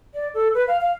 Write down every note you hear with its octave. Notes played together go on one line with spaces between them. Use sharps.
D5
A4
B4
F5
F5